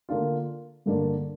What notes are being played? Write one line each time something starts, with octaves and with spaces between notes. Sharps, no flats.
D3 A#3 D4 F4
G2 D3 A#3 D4